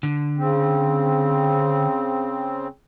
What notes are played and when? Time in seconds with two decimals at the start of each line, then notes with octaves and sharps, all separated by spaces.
0.03 D3
0.38 C#3 C4